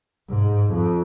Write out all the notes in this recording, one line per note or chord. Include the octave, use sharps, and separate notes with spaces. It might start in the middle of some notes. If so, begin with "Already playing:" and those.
G#2
F2